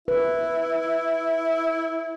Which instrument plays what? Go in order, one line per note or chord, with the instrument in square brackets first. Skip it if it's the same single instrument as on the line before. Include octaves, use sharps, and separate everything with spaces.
[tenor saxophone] E4 [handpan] B4